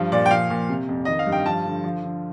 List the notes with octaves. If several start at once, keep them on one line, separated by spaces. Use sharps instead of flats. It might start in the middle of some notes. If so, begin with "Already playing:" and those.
Already playing: G2 F3
A#2 D5
G5
F3 F5
A#2
C3
F2
D#3 D#5
F5
G2
G5
F3 A5
D3
F3
D3